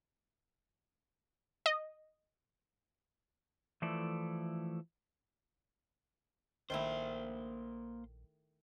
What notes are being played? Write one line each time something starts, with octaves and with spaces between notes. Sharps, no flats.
D#5
E3 F3 A3 E4 A4 D5
A#1 D#3 A3 A#3 E4 C5